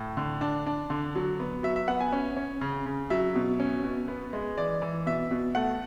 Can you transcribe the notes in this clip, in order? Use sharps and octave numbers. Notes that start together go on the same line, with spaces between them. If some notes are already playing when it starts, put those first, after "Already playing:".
Already playing: A2
D3
D4
D4
D3
F#3
B3
F#3 E5
E5
B3 F#5
G#5
C#4
C#4
C#3
C#3
F#3 E5
B2
C#4
B2
B3
G#3
E3 D5
E3
B2 E5
B2
A3 F#5